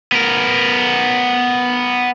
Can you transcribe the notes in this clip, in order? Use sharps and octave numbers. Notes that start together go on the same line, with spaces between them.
B3 A#4